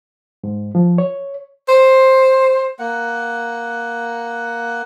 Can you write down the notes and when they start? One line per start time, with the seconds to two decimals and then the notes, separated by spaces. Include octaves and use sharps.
0.44 G#2
0.75 F3
0.98 C#5
1.69 C5
2.79 A#3 F#5